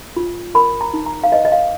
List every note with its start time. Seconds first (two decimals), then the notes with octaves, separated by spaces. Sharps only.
0.16 F4
0.55 A#4 B5
0.81 A#5
0.93 D#4
1.06 A#5
1.24 F5
1.32 B4 D#5
1.45 D#5
1.52 F5